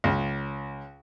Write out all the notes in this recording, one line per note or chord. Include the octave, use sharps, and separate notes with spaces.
C#2